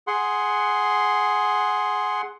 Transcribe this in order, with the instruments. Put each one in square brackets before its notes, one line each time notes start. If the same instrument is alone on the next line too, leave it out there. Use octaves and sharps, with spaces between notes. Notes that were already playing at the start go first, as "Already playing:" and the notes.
[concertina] G#4 F#5 C6